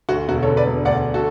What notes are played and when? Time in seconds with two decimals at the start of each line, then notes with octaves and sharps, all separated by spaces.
0.09 D2 F#4
0.28 E1 F#4
0.43 A4 C#5
0.47 D3
0.57 B4 D5
0.67 E1
0.85 D2 D5 F#5
1.14 F#4 A4